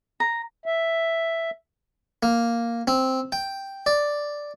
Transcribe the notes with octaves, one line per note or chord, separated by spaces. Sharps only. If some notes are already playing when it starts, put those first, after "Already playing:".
A#5
E5
A#3
C4
G5
D5